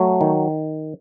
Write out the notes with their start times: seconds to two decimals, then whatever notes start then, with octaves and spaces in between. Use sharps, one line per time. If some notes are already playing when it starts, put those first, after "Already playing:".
Already playing: F#3 A3
0.21 D#3